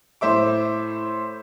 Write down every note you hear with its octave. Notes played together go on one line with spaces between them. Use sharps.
A2 C5 E5 D6